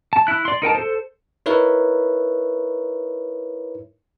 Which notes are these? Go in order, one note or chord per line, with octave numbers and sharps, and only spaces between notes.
A5
E4 F#6
D5 C6
D#4 A#4 G5 A5
A4 C5
D#4 E4 A#4 B4 C#5 E5